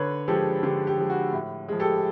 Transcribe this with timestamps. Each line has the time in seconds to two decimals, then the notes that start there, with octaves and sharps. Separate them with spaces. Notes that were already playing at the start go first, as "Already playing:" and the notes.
Already playing: D3 B4 C#5
0.28 F3 G#3 G4 A4
0.63 D3 G4
0.87 G4
0.98 F3 G#3
1.10 F#4
1.32 A2
1.68 F3 G#3
1.80 G4 A4